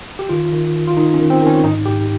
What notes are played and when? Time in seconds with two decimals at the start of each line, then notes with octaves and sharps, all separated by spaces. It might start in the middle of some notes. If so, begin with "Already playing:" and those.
0.19 G4
0.29 D#3 F4
0.52 D#3
0.75 D#3
0.87 F4
0.96 D#3 D#4
1.14 C#4
1.19 D#3
1.30 C4
1.41 D#3
1.47 C#4
1.63 G#2 D#4
1.86 G#2 G4